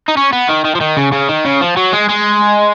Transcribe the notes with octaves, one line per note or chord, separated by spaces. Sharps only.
D#4
C#4
B3
D#3
D#3
F3
D#3
C#3
C#3
D#3
C#3
F3
F#3
G#3
G#3